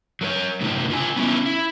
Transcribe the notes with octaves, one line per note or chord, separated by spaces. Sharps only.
F#3 A#4 C#5
A2 C3 D#3 D4 E4
D3 F4 G#5
B3 C#4 E4
E4